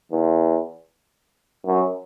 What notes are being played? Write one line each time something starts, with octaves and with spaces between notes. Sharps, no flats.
E2
F#2